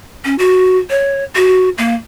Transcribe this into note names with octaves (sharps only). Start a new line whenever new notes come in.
C#4
F#4
C#5
F#4
A#3